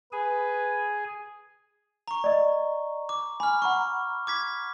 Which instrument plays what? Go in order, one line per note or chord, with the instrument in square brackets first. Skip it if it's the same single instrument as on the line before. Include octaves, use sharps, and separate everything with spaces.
[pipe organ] G#4 G#5 [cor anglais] B4
[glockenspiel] A#5 C#6
[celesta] D5 D#5
[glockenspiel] D6
[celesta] G#5 [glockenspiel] B5 F6
[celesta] F#5 A#5 B5 [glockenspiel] C#6
[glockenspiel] D6 G#6 B6